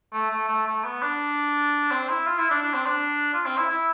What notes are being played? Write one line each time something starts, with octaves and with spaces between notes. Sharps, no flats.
A3
A3
A3
A3
B3
D4
C4
E4
F4
E4
D4
D4
C4
D4
F4
C4
E4
E4